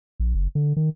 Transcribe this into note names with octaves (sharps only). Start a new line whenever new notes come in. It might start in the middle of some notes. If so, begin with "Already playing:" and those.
A#1
F#1
D3
D#3